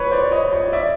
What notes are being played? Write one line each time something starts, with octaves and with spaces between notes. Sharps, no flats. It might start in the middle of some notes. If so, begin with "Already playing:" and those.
Already playing: B4 C#5
C5 D5
C#5 D#5
C#5 D#5
D5 E5